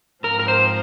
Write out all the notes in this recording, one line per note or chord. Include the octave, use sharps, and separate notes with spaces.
G#2 F3 C4 A#4
A#4
C5